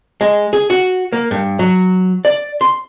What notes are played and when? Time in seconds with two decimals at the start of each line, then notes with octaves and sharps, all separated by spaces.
0.21 G#3
0.53 G#4
0.70 F#4
1.13 A#3
1.31 G2
1.59 F#3
2.25 D5
2.61 C6